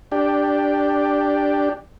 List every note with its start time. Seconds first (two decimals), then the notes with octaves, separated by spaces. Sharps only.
0.12 D4 G4